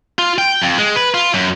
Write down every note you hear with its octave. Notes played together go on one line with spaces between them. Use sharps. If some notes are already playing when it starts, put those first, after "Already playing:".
F4
G5
F2
G#3
B4
F4
F#2